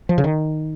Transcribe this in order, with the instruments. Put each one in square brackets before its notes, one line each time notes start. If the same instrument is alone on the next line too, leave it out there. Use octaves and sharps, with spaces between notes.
[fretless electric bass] F3
C#3
D#3